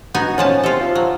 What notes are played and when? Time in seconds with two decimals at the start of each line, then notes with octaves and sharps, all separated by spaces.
0.14 B3 D#4 F#4 G#5
0.38 A#2 F3 C#4 A5
0.63 C3 F4 A4
0.80 F3
0.95 F#3